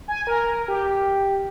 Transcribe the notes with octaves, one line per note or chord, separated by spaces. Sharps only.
G#5
A#4
G4